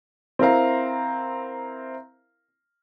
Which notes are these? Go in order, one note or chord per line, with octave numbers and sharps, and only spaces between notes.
C4 E4 A#4 F5 A#5